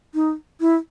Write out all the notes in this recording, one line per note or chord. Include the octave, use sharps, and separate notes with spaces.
D#4
E4